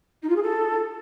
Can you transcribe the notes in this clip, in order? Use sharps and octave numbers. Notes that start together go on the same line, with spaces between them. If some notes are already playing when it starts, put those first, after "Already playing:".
D#4
F4
G#4
A4